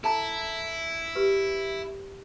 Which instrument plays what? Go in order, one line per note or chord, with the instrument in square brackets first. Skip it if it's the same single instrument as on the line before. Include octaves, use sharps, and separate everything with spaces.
[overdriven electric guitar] E4 [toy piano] A4 A5 A#5
[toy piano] G4 B4